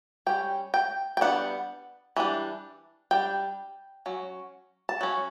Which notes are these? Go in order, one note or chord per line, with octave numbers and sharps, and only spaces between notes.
G3 C#4 G5
G5
G5
G3 B3 D4 F#5
E3 G3 D4
G3 D4 G5
F#3 C#4
A5
F#3 C#4